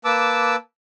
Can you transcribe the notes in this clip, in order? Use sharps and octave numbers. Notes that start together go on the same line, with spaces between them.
A#3 B4 A5 D6 E6